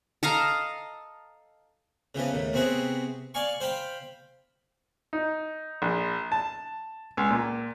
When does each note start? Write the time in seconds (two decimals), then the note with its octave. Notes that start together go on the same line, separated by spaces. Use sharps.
0.23 A4 D#5 F5 A#5
2.15 C#3 E3 F3 B3
2.31 D#2 A2
2.53 C3 B3 C4 F#4 G#4
3.34 D5 F5 G#5 C#6
3.60 C5 F5 G5 B5
5.13 D#4
5.82 A#1
6.32 A5
7.17 C#2
7.30 A#2